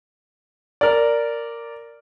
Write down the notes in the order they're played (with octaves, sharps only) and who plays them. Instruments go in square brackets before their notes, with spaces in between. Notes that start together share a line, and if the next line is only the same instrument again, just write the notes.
[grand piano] A#4 D5